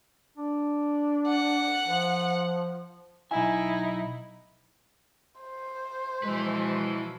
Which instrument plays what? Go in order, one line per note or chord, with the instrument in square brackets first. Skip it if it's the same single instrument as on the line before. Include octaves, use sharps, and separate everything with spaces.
[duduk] D4
[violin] F#5
[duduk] F3
[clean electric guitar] B1 G#5 [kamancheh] D#4 E4
[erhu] C5
[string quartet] B2 F3 F#3 [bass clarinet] G#3 [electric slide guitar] E4 B4